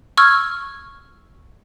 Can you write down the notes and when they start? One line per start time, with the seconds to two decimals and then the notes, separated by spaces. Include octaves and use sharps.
0.17 C#6 E6 F6 G#6